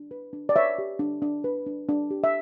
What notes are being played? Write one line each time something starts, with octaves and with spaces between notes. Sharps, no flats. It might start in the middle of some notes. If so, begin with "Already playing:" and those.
Already playing: D4
B4
D4
D5
B4 C#5 E5
G4
D4
D4
B4
D4
D4
G4
E5